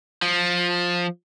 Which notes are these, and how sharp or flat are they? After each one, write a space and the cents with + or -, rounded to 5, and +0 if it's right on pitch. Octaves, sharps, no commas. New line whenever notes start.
F3 +15